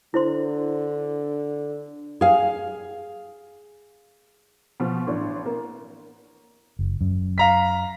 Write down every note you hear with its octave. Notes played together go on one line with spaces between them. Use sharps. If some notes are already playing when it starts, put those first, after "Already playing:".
D3 E4 C5 C6
G#4 F5
B2 F3
A1 D4
A#3
F#1
F#2
F5 A#5 B6